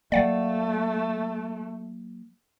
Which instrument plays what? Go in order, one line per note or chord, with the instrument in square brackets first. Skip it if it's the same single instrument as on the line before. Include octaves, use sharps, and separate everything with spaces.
[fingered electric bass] F#3 A#3 [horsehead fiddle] A3 [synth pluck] D5 F5 F#5